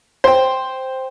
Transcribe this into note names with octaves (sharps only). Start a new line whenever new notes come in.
C5 G5